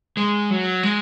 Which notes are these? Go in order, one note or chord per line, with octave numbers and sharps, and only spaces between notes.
G#3
F#3
G#3